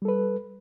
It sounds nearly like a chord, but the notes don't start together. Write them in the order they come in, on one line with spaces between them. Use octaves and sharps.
G3 A4 B4